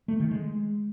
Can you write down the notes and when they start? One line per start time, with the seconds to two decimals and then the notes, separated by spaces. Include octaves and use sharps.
0.08 A3
0.20 D#3
0.31 G#3